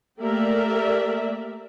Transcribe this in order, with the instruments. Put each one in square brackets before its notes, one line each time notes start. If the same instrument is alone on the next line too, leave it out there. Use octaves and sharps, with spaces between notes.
[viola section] A3 A#3 G4 A#4 D5 E5